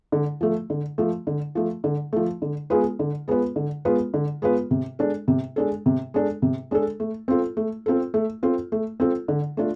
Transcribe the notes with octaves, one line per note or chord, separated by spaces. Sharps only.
D3
F3 A3
D3
F3 A3
D3
F3 A3
D3
F3 A3
D3
G#3 B3 F4 B4
D3
G#3 B3 F4 B4
D3
G#3 B3 F4 B4
D3
G#3 B3 F4 B4
C3
G#3 D4 A4
C3
G#3 D4 A4
C3
G#3 D4 A4
C3
G#3 D4 A4
A3
C4 F4 A4
A3
C4 F4 A4
A3
C4 F4 A4
A3
C4 F4 A4
D3
A3 D4 F4